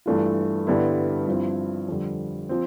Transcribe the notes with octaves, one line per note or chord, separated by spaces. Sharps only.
G2 E3 A3 D4 F4
G2 D3 G3 B3 E4
G2 F3 C4 E4
F2 D3 G3
F3 C4